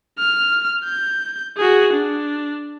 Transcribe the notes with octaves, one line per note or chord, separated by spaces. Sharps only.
F6
G6
F#4 G#4
D4